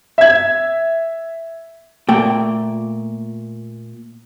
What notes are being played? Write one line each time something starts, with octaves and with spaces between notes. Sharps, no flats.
E5 G#6
A#2 A3 G5